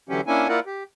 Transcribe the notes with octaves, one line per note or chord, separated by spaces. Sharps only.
D3 E3 F#3 C#4 G4
A#3 C#4 D4 E4 G#5
A#3 E4 F4 A#4 D5 F#5
G4